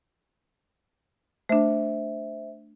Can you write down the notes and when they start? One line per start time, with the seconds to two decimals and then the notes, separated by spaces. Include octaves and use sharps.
1.49 A3 D4 C5 E5